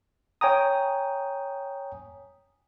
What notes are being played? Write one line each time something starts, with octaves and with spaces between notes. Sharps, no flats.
C#5 G5 G#5 A#5 D#6